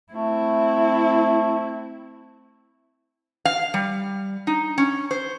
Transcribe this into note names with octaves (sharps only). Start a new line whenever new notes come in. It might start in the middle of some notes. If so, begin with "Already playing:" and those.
A3 C4 E4
F5
G3
D#4
C#4
C5